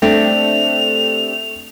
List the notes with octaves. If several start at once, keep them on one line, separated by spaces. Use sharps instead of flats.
A3 C4 D4 G4 F7